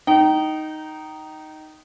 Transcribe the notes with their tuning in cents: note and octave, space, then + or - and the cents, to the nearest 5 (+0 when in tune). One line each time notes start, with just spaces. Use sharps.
D#4 +0 G5 -30